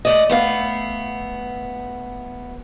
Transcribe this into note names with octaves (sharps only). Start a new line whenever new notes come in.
A3 D5 D#5
A3 B3 F5